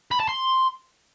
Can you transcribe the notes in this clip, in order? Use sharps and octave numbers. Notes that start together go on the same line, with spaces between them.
B5
A5
C6